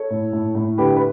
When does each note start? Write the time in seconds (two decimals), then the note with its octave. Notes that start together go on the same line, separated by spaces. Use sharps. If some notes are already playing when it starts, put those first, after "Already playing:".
Already playing: A4 C#5
0.10 A2
0.33 A2
0.55 A2
0.78 D3 G4 B4
0.96 B4